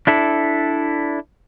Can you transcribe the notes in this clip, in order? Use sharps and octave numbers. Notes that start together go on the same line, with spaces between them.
D4 E4 A4